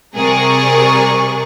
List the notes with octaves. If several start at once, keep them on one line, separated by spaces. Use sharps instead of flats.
C3 G3 G#4 A#4 D5 C#6